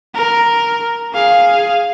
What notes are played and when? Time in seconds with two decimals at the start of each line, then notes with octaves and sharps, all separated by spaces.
0.15 A#4
1.14 G#4 F5